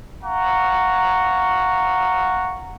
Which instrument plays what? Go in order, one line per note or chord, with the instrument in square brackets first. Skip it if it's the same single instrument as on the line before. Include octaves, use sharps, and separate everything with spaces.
[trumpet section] F5 F#5 A#5 C#6